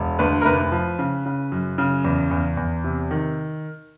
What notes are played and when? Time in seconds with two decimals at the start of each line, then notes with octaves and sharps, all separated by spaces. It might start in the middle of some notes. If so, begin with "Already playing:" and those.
Already playing: E1
0.19 D2 B4
0.41 A#4
0.45 F1 B4
0.72 F3
0.99 C#3
1.26 C#3
1.52 F#2
1.78 C#3
2.04 E2
2.31 E2
2.57 E2
2.84 C3
3.11 D#3